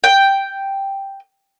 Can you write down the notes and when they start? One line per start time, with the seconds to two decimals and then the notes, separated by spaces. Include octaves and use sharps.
0.04 G5